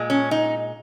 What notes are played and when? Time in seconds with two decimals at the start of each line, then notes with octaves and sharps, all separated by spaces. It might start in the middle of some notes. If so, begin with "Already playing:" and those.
Already playing: A#2 G#3
0.10 C#4
0.31 D#4